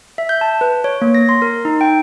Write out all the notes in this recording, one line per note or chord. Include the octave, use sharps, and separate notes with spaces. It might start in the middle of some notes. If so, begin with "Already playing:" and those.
E5
G6
A5
B4
C#5
A#3
A#6
C6
A#4
D#4
G5